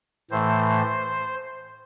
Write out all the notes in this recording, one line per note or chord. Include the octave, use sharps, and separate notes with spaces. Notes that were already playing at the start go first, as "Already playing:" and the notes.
A2 E3 A3 C5